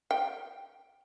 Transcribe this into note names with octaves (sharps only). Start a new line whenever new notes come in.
G5